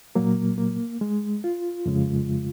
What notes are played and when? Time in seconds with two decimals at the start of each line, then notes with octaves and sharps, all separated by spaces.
0.15 A#2 F#3 A#3
0.58 A#3
1.01 G#3
1.44 F4
1.86 F2 C#3 G#3